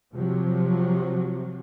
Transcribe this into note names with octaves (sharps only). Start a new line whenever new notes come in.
C3 F3 F#3